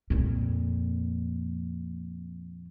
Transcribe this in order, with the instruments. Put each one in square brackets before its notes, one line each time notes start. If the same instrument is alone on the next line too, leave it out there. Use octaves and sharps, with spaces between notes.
[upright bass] F2 A#2